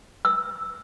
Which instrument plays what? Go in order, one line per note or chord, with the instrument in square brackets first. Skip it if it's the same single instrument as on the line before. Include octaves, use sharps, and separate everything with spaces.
[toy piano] E6